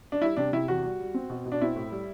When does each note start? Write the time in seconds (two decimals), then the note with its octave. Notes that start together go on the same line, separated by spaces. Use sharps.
0.12 D4
0.22 G3 E4
0.37 C3 D4
0.53 C3 E4
0.68 E2 F#4
0.83 G3
0.99 G3
1.14 C4
1.30 B2
1.46 B2
1.52 D4
1.61 C4 E4
1.76 A2
1.92 G3